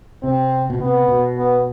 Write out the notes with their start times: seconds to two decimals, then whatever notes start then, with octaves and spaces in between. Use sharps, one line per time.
0.23 C3 C4
0.70 B2
0.80 C3 B3
1.08 B2
1.37 B3